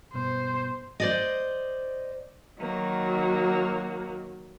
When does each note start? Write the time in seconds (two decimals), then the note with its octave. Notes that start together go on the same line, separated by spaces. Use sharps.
0.14 G2 B2 C5
1.00 C5 D5 D#5
2.58 D#3 F#3 A#3 F#4